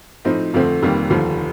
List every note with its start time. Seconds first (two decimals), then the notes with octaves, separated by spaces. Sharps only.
0.25 A2 F3 C4 D#4
0.54 F2 D3 F3 A3 C4
0.82 F1 F2 D#3 G3 A#3
1.10 F1 D#2 D3 F3